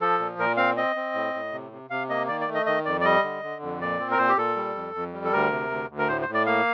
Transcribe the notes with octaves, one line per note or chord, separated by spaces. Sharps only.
F3 A4
A#2
A#2 A#4
C4 F5
C4 D#5
C4
A2
A2
C3
C3
C3 F5
A#3 D#5
D#3 D5
D5
A3
D#5
D#3 D#5
F2 D5
D5
G3 D#5
D3
D3
F2
A#2 D5
C4
A#4
A#2 C5
G4
A#2 A4
G3
F2
F2
G3
A4
D2 A#4
C3
D2
D2
A#4
A2 C5
C5
A2
D5
A#3 F5